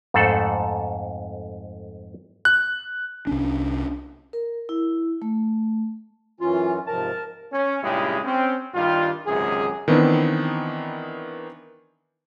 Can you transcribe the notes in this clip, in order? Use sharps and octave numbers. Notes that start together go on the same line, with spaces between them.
F2 G#2 A3 A4 C5 F#5
F#6
C2 C#4 D4
A#4
E4
A3
F#2 E3 C#4 F4
G#2 C3 F3 A#4 A5
C#4
G2 A#2 C#3 G#3 E4 G4
C4 C#4
G2 D#3 G3 F4
G#1 C#2 F#2 C3 G#4
D#3 E3 B3 C4 D4 D#4